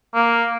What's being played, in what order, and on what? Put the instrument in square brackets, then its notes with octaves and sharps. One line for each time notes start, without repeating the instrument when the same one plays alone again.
[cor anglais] A#3